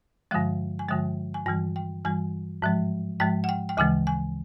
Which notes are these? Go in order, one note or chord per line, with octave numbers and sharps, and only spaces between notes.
G2 D3 F3 G#3 F5
G#5
G2 D3 F3 G#3 G5
G#5
G2 E3 G3 G5
G5
G2 E3 G3 G#5
G#2 F3 G#3
G#2 F3 G#3 G5
F#5
G5
G5
D2 C#3 E3 G#3 G#5
G#5